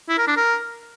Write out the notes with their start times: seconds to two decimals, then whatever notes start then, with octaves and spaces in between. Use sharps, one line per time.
0.09 E4
0.18 A#4
0.27 D4
0.37 A#4